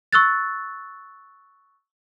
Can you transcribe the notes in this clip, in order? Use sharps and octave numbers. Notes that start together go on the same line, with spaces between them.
C#6 E6 F#6 A6